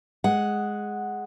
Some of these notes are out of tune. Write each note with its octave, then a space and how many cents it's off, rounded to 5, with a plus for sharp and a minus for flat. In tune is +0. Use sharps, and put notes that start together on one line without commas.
G#3 +0 F#5 +0